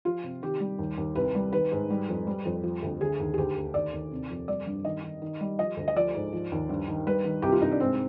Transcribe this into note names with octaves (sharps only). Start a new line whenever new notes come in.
F3 F4
C3
D#3 G4
G3
D#2
D#2
C2 B4
G3
D#3 B4
G#2
G3
F2
G3
F2
F3
D2
D3 G#4
D#2
G#4
D2 G4
D2
D#2 D5
D#2
C3
F2
G3 D5
G2
D#3 D#5
D#3
D#3
G3
F3 D#5
D2
D#5
F3 D5
G#2
F3
D#2
G2
D#3
G3 B4
D#3
C2 G4
F4
C2 D#4
D4
G#2 C4